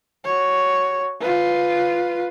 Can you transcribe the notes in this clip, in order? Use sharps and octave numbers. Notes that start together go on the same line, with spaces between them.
F#4 C#5
F4 B4